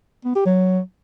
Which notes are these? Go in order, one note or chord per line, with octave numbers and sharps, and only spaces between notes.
B3
G4
F#3